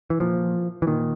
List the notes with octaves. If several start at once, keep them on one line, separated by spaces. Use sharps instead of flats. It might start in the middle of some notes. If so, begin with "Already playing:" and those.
E3
A#2 F3
E3
A#2 D#3